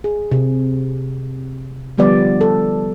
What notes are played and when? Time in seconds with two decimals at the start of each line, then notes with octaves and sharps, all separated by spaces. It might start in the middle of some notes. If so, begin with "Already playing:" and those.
0.04 G#4
0.31 C3
1.98 D3 F3 G3 B3 D5
2.41 A4